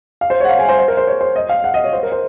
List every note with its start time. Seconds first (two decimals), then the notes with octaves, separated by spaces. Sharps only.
0.21 F5
0.30 C5
0.40 C#5
0.45 F#5
0.49 F5
0.59 G#5
0.69 C5
0.79 C5
0.88 A#4
0.97 C5
1.07 C#5
1.21 C5
1.36 D#5
1.49 F5
1.64 F#5
1.74 D#5
1.84 C#5
1.93 C5
2.03 A#4
2.12 C5